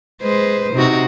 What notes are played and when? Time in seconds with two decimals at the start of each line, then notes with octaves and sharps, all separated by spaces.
0.22 G#3 B4 C5
0.74 C3 D#4 F#4